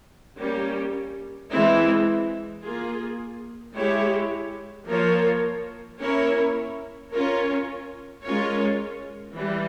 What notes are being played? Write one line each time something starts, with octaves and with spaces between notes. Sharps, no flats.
G3 A#3 C#4 G4
E3 G#3 C4 E4
A#3 F4 G#4
G#3 E4 G4 C#5
F3 A#3 F4 A#4 C#5
A#3 C#4 E4 A#4 C#5
C#4 F4 A#4 C#5
G#3 C#4 F4 A#4 C#5
E3 G3